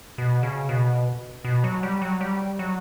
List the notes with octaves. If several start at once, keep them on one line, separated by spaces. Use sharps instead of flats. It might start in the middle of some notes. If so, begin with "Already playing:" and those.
B2
C#3
B2
B2
F#3
G3
F#3
G3
F#3